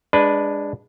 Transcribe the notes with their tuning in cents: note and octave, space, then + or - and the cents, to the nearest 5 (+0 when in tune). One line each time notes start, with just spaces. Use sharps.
G#3 -20 D4 +0 B4 +0